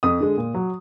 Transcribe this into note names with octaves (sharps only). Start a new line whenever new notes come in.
F2 D#6
D3 G#3
A#2
F#3